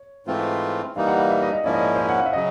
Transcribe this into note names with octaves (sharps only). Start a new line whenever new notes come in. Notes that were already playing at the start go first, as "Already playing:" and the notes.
Already playing: C#5
G#2 E3 A3 C4 F4
E3 G3 A#3 D#4 F5
F#5
F5
E5
D#5
D#5
G#2 F3 A#3 C#4 E4 D5
D#5
D5
C5
C#5
F#5
F5
E5
C#3 F#3 D#5